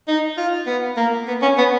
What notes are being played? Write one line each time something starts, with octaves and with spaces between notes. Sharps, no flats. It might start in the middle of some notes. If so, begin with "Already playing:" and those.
D#4
F4
B3
A#3
B3
C#4
B3